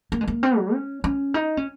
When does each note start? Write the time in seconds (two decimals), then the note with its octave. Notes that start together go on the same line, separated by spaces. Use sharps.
0.12 A#3
0.21 G#3
0.28 A#3
0.43 C4
0.58 F#3
0.73 C#4
1.04 C#4
1.34 D#4
1.57 C#4